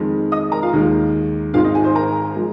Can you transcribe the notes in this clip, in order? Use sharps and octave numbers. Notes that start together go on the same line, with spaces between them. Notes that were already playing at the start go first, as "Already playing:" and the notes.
Already playing: F2 D#3 G#3
D#5 D#6
A#4 A#5
F4 F5
D#2 D#3 G#3
G#1 G#2 D#3 G#3 F4 F5
D#4 D#5
G#4 G#5
C5 C6
A#4 A#5
F3 G#3